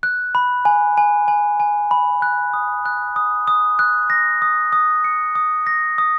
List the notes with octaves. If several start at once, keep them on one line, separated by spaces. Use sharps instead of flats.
F#6
B5
G#5
G#5
G#5
G#5
B5
F#6
D#6
F#6
D#6
D#6
F#6
A#6
D#6
D#6
C#7
D#6
A#6
D#6